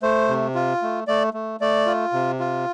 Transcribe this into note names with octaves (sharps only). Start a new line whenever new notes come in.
A3 C5
C3
F4
A3
A3 D5
A3
A3 D5
F4
C3
F4